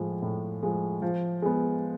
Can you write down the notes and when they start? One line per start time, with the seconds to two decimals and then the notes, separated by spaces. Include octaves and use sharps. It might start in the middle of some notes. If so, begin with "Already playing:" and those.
Already playing: A2 F3 G#3
0.22 A2
0.62 F3 G#3
1.02 F3
1.42 G#3 B3